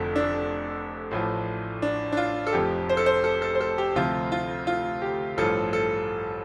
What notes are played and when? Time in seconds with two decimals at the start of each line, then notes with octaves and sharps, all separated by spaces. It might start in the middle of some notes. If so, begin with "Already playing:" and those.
Already playing: F1 F2 D3 F3 A4
0.16 D4
1.11 A1 A2 F3
1.82 D4
2.12 D4
2.17 F4
2.47 A4
2.53 F1 F2 F3 G4
2.89 C5
2.97 A4
3.06 C5
3.24 A4
3.42 A4
3.55 C5
3.61 A4
3.78 G4
3.96 D2 C3 F3 F4
4.32 F4
4.67 F4
5.02 G4
5.37 A1 G2 F3 A4
5.73 A4